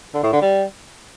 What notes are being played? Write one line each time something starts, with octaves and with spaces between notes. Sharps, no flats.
D3
A2
D3
G3